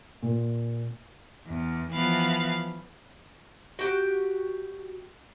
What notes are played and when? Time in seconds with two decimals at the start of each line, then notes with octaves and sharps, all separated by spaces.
0.23 A#2
1.46 E2
1.90 E3 F3 B3 F5 B5
3.79 F#4 G4 G5